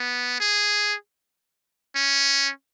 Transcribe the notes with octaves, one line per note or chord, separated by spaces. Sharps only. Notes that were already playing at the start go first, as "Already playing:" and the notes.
Already playing: B3
G#4
C#4